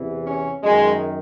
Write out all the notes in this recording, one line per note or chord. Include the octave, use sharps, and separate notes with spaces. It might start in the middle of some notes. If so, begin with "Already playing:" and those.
Already playing: E2 C3 E3
C#4
F#2 D#3 G#3